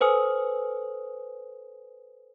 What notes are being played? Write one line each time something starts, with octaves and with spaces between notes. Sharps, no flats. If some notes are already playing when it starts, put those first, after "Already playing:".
A4 B4 C5 G#5 D#6